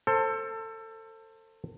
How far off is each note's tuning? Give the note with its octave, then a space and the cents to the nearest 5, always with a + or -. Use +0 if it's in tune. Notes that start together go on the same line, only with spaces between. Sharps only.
A4 +25 C5 +20